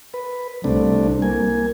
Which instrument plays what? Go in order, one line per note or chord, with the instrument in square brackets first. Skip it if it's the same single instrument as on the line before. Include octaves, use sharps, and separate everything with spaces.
[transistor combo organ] B4
[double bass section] C2 [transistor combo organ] C3 A3 D4
[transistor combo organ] A#3 G#5